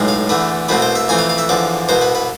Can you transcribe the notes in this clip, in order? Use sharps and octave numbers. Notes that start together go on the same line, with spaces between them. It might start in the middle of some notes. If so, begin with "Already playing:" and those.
Already playing: B1 A2 G#3
F5
E2 D3 A3 B4
C2 B2 A3 C4 B4
C5
E5
F2 E3 A3 C4 G#5
F5
F5
E5
E2 D3 F3 D5
C2 B2 B3 C5
B4
B4